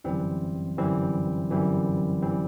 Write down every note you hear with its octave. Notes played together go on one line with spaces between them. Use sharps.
G1 F#2 E3 G3 C4
G1 F#2 E3 G3 C4
G1 F#2 E3 G3 C4
E3 G3 C4